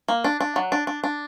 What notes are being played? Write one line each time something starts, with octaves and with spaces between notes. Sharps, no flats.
A#3
D4
D4
F#3
D4
D4
D4